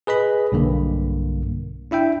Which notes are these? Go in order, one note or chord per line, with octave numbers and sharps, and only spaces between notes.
G#4 B4 D#5 B5
B1 G2 D3 A#3
D4 E4 E5 G5 B5